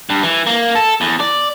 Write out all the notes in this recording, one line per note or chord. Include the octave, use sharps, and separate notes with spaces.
G2
E3
A#3
A4
E2
D5